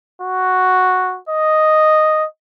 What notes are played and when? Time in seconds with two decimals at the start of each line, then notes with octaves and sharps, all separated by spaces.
0.21 F#4
1.29 D#5